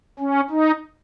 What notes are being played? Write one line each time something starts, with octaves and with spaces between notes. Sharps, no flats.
C#4
D#4